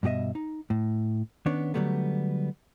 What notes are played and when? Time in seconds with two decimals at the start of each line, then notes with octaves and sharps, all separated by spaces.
0.03 G2 B2 G4 D#5 E5
0.35 D#4
0.70 A2
1.46 D#3 B3 C#4 D4 C#5
1.74 D3 E3 F#3 G3 A3 B3